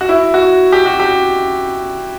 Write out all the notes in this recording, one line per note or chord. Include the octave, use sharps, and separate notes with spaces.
F#4
E4
F#4
G4
F#4
G4